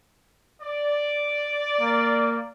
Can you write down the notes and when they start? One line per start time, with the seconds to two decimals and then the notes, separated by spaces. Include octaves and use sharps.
0.61 D5
1.81 A#3